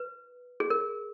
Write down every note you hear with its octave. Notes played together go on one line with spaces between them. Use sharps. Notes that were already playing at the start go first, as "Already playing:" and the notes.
Already playing: B4
G#4
A#4